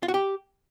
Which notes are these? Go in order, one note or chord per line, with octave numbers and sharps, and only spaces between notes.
F4
F#4
G4